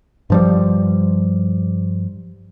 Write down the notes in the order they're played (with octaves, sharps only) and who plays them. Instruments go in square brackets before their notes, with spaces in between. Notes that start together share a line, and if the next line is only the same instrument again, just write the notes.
[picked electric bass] G2 F3 G3